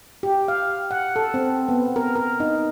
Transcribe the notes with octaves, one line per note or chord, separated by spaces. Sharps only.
G4
F5
F#5
A4
C4
B3
A#4
A#4
D#4